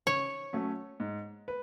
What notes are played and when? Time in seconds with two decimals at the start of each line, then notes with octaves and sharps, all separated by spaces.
0.06 C#3 C#5
0.53 F#3 A3 C#4
1.00 G#2
1.48 B4